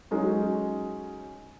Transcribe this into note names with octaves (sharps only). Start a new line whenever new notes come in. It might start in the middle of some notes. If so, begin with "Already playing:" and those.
F#3 G#3 C#4 D#4